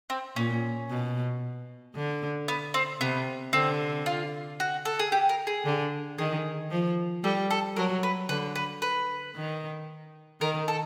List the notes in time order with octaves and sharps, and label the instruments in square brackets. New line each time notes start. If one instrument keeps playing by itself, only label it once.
[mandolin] C4
[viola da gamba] A#2 [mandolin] C#4
[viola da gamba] B2
D3
[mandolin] B3
C4
[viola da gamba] C3 [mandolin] B3
[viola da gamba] D3 [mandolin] C4
[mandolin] F4
F#4
A4
G#4
G4
A#4
G#4
[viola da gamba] D3
[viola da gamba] D#3 [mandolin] G#4
[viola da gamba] F3
[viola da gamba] G3 [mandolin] A4
[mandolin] A4
[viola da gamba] F#3 [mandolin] A#4
[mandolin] B4
[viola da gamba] D3 [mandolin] B4
[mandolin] B4
B4
[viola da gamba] D#3
[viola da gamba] D#3 [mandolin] A#4
[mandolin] A4